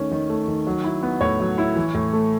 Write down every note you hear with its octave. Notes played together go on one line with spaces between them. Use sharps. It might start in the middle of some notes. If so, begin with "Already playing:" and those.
Already playing: D#3 A3 C#4
D#3
A3
D#3
F#3
E4
B3
A2 C#5
F#3
E4
E3
A2
A3